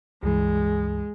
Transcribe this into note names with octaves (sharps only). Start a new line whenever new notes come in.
C#2 G2 E3 G#3